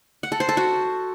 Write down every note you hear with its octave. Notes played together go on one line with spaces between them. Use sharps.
F#5
A4
C5
A4
F#4